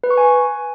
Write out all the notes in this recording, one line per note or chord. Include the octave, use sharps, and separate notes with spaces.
B4
C#6
G#5